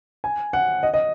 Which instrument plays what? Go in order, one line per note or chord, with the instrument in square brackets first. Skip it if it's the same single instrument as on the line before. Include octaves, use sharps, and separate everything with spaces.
[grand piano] G#5
F#5
D#5
D#5